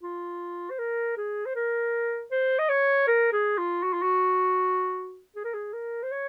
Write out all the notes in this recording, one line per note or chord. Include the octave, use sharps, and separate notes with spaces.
F4
C5
A#4
G#4
C5
A#4
C5
D#5
C#5
A#4
G#4
F4
F#4
F4
F#4
G#4
A#4
G#4
A#4
C5
C#5